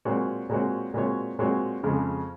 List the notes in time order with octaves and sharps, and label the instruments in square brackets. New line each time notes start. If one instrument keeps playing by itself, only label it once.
[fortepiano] A#2 G#3 C4 F#4 C#5
A#2 G#3 C4 F#4 C#5
A#2 G#3 C4 F#4 C#5
A#2 G#3 C4 F#4 C#5
F2 C#3 G#3